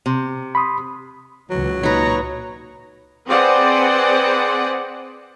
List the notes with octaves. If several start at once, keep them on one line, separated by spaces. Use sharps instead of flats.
C3
B5 C6 D#6
C#2 E3 F#3
A#2 D#4 B4 C#5 A#5
C4 G#4 B4 C5 D5 F#5